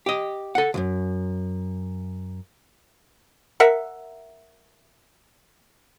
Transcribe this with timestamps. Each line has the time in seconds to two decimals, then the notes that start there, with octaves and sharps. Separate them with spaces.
0.06 G4 D#5
0.55 A4 F#5
0.74 C#2 F#2
3.60 A#4 E5 F#5